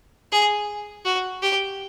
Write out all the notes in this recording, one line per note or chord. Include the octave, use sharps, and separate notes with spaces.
G#4
F#4
G4